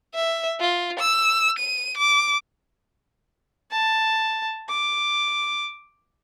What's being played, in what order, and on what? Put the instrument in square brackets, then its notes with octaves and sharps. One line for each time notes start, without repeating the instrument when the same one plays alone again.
[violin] E5
F4
E6
D#7
D6
[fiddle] A5
D6